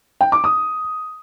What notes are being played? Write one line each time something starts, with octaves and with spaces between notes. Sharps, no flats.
G5
D6
D#6